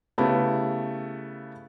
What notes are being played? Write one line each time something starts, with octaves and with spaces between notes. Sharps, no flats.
C#3 A3 B3 E4 G4